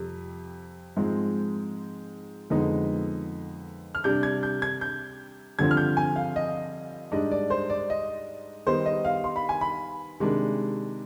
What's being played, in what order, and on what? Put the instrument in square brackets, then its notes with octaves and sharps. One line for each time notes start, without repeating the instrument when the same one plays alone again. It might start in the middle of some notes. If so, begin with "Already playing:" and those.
Already playing: [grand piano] F2 C3 G3
G#2 F3 G#3 C4
F2 D3 G#3 B3 D#4
F6
C3 G3 D4 G6
G#6
G6
G#6
G6
G2 D3 F3 C4 G#6
F6
G6
G#5
F5
D#5
G#2 G3 D4 D#5
D5
C5
D5
D#5
D#3 G3 B3 D#4 C5
D#5
F5
C6
B5
G#5
B5
C3 D#3 G#3 D4